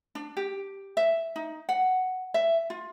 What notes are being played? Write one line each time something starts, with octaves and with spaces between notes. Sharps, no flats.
D4
G4
E5
D#4
F#5
E5
F4